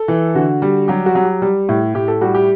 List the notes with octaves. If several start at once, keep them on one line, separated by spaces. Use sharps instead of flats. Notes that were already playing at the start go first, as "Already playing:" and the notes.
Already playing: A4
E3
D3 F#4
G3
F#3 G4
F#4
F#3
G4
G3
A2
A2 G4
A4
G3 F#4
G4